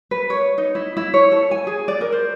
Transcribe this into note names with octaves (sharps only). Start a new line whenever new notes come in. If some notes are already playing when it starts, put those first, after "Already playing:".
B4
C#5
D#4
E4
E4
C#5
A4
G#5
G#4
D5
A#4
C5